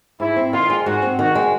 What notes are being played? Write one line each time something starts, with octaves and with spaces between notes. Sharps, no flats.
G#2 E4
C4
D#3 F4
G#3
G#2 F#4
C4
D#3 F#4
G#3